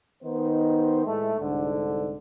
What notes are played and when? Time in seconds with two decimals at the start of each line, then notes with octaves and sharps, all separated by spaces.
0.23 D#3 B3 D#4 C5
1.06 A2 G#3 A3
1.39 C2 G#2 D3